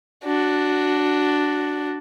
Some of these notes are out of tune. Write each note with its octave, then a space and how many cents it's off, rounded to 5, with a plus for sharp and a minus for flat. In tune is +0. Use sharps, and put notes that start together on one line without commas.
D4 +0 F#4 +0